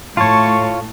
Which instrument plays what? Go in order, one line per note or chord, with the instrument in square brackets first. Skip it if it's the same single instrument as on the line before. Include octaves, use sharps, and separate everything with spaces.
[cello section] A2 [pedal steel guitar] F4 C#5 [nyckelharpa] A5 C#6